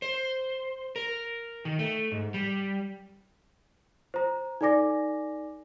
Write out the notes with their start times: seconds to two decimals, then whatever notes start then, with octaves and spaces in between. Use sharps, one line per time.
0.02 C5
0.96 A#4
1.65 D#3
1.79 A3
2.12 G#2
2.34 G3
4.14 C5 A#5
4.61 D#4 A4 D5 G#5 D6 A#6